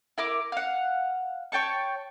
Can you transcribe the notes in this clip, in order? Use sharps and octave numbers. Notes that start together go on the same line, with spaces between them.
E4 A#4 D6
F5 F#5
C#5 G5 A5 C#6